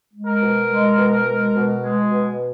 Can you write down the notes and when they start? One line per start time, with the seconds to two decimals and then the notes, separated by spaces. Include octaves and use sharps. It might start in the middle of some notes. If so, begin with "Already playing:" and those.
0.13 G#3
0.27 A#4
0.42 B2
0.70 G#3
0.97 B2
1.27 G#3
1.55 B2
1.83 G#3
2.12 B2